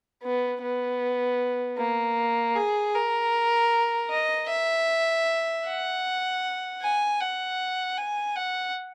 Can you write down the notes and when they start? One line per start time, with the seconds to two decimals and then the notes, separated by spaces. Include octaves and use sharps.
0.23 B3
0.62 B3
1.78 A#3
2.55 G#4
2.95 A#4
4.10 D#5
4.49 E5
5.65 F#5
6.82 G#5
7.21 F#5
7.98 G#5
8.36 F#5